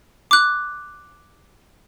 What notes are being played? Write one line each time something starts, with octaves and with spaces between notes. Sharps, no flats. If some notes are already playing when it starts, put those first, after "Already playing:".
D6 F#6